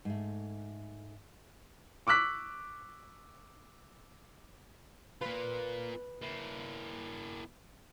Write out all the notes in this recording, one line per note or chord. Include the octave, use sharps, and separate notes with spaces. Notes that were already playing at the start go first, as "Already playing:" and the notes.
G#2 A3
C#6 D6 E6 F#6 B6
A#3 F4 B4
A#3 E4